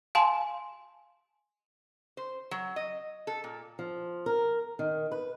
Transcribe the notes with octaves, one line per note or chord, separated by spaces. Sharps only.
F5 G#5 A5 C6
C5
F#3
D#5
A4
A#2
F3
A#4
D#3
B4